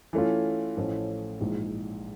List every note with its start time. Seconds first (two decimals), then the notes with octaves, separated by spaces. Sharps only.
0.13 E3 A3 C#4 F4
0.77 A1 A2 F3 A3 C#4
1.40 A#1 G#2 E3